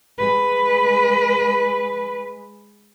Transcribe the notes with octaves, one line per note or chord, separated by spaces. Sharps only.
G#3 B4